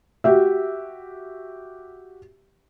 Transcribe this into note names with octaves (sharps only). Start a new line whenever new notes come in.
F#4 G4 E5